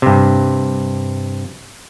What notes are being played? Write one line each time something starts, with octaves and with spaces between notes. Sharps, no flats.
G2 C3